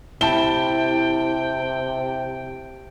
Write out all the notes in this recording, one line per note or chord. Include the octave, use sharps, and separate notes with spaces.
C3 E4 G5 A5 G7